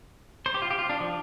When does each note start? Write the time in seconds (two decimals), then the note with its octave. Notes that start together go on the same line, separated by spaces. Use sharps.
0.46 C5
0.54 G4
0.62 F4
0.71 G4
0.79 F4
0.89 D4
1.00 F3